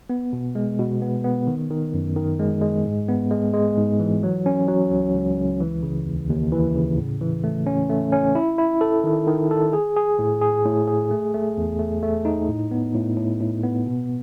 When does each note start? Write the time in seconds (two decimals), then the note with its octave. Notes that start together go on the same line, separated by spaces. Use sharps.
0.10 B3
0.33 B2
0.55 G#3
0.79 B2
1.02 B3
1.24 B3
1.47 D#3
1.70 D#3
1.94 F#2
2.16 D#3
2.39 G#3
2.61 G#3
2.85 G#2
3.08 B3
3.31 G#3
3.54 G#3
3.77 G#2
4.00 E3
4.23 F#3
4.46 C#4
4.68 F#3
4.91 C#2
5.14 C#2
5.37 C#2
5.61 E3
5.83 C#3
6.06 D#2
6.30 D#2
6.52 E3
6.75 C#3
6.98 A2
7.21 E3
7.44 A3
7.66 C#4
7.90 A3
8.12 C#4
8.35 E4
8.58 E4
8.81 A4
9.04 D#3
9.27 D#3
9.51 A4
9.73 G#4
9.96 G#4
10.19 A2
10.41 G#4
10.65 A2
10.88 G#4
11.11 A3
11.34 A3
11.57 E2
11.79 A3
12.03 A3
12.25 D#4
12.49 A2
12.71 B3
12.95 A2
13.17 A2
13.40 A2
13.63 B3
13.86 B2